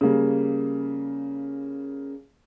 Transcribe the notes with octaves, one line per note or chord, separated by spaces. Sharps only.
C#3 G3 A#3